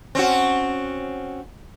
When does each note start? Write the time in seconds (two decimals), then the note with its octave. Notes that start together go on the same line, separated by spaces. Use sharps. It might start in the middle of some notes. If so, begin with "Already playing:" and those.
0.15 C4 C#4 F#4